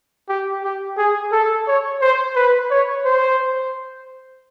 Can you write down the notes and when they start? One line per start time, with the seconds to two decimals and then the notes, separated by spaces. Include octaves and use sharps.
0.29 G4
0.63 G4
0.98 G#4
1.32 A4
1.67 C#5
2.02 C5
2.36 B4
2.71 C#5
3.05 C5